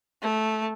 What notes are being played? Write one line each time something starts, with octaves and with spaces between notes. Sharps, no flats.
A3